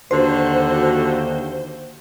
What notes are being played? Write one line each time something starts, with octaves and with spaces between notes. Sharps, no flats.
D#2 D3 F#4 C5